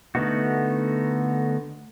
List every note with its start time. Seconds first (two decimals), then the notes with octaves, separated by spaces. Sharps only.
0.15 D3 A3 B3 D#4 F#4